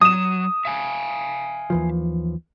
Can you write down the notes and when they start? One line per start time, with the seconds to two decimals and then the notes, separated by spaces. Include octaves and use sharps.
0.01 F#3 D#6 E7
0.65 E5 F5 G#5
1.70 D#2 E3 F3